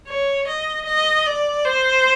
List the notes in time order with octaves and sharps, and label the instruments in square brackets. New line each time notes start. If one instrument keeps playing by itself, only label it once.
[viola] C#5
D#5
D#5
D5
C5